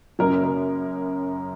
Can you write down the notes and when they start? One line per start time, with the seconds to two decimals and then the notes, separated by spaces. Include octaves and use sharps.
0.19 F#2 C#3 F#3 A#3 A#4
0.43 A#4